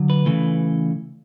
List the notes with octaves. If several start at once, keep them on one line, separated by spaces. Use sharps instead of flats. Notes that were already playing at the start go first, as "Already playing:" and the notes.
Already playing: D3 F#3
B4
C#3 E3 A3